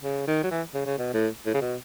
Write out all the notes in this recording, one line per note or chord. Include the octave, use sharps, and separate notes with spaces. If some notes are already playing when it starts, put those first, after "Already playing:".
C#3
D#3
F#3
E3
C#3
C#3
B2
A2
A2
C#3
B2